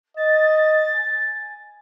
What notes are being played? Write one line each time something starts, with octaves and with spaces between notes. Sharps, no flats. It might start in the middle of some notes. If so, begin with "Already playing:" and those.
D#5 A6
G#5